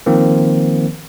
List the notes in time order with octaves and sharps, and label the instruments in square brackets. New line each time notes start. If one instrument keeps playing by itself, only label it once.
[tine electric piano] D#3 F3 A#3 C4